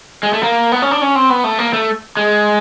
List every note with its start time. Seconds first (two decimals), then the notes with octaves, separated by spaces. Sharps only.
0.23 G#3
0.33 A3
0.43 A#3
0.72 B3
0.82 C#4
0.91 D4
1.01 C#4
1.16 C4
1.30 B3
1.44 A3
1.59 A#3
1.73 A3
2.17 G#3